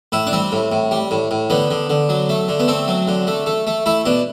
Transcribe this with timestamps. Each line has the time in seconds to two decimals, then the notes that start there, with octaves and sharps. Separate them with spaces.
0.12 A2 E4
0.27 D4
0.33 G3 C4
0.52 A2
0.72 A2
0.91 G3
1.11 A2
1.31 A2
1.50 D3 B3
1.71 D3
1.90 D3
2.09 F#3
2.29 A3
2.49 D3
2.60 B3
2.68 A3 C4
2.88 F#3
3.08 D3
3.27 A3
3.46 A3
3.67 A3
3.86 A3 E4
4.05 B2 D4